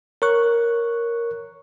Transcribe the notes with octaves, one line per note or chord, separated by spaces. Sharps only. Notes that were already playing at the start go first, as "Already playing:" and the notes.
A#4 C#5 C#6 F#6